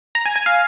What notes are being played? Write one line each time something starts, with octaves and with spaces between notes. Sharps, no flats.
A#5
G#5
G#5
F5